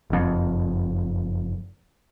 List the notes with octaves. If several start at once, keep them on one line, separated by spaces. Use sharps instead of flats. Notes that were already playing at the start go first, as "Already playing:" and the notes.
F#1 F2